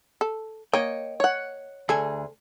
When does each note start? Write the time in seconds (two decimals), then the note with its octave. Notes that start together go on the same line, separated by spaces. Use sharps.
0.21 A4
0.73 A#3 C#5 D#5 G5
1.20 C#5 F#5
1.89 D2 G#4 A4 G#5